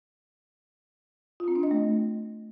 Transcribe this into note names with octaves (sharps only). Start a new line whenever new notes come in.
F4
C4
D4
D#5
A3